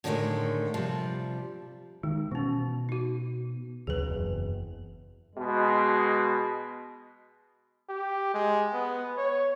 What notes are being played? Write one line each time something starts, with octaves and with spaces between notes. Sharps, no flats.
A2 D3 D#3 F#3 G#3 A3
C3 F3 G3
D#3 G#3
B2 E3 C#4
D#4 F#4
D2 C#3 F#3 G#4 B4
F#1 E2
B2 G#3
G4
G#3
B3
C#5